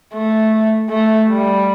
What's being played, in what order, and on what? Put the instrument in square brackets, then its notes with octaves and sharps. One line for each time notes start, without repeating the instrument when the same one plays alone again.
[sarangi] A3
A3
G3